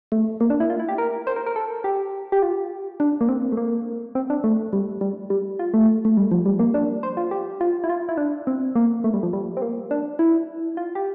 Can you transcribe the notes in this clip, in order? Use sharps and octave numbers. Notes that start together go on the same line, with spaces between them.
A3
A#3
D4
E4
F4
E4
G4
A#4
C5
A#4
A#4
A4
G4
G4
F4
D4
A#3
C4
A3
A#3
C4
D4
A3
G3
G3
G3
F4
A3
A3
G3
F3
G3
A#3
D4
C5
F4
G4
F4
E4
F4
E4
D4
C4
A#3
A3
G3
F3
G3
C4
A#3
D4
E4
F4
G4